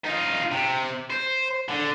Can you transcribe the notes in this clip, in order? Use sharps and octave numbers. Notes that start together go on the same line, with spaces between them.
D#4 F4
C3
C5
D3